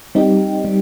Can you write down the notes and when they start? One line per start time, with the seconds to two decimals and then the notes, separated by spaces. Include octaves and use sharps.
0.15 G3 C4 D#4 G4
0.65 G3